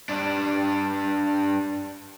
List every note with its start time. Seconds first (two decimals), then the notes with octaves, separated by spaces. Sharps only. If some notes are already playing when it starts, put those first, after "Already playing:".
0.09 G2 D4